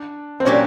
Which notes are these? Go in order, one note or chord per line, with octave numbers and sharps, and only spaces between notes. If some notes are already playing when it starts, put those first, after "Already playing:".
Already playing: D4
C4
A#2 F#3 A#3 C#4 D4 G4